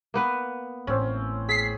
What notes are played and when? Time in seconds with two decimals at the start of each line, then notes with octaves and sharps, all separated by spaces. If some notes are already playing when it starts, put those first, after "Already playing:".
0.14 A#3 B3 B4
0.87 A1 A2 C4 C#4
1.49 G#4 B6 C7